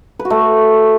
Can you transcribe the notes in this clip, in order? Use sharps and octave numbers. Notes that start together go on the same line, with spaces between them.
B4
F#4
A3